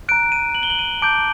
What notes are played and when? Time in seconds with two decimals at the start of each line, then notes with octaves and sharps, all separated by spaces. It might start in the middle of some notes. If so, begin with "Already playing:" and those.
0.09 A#5 F#6 D7
0.32 D#7
0.55 F#7
0.63 G7
0.70 F#7
0.79 D#7
1.02 A5 D6 G6 D7